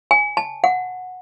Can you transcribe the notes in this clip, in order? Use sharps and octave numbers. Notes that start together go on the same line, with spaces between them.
G#5
A5
F#5